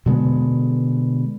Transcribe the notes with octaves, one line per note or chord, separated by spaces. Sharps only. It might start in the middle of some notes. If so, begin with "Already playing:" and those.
B2 D3 G#3 B3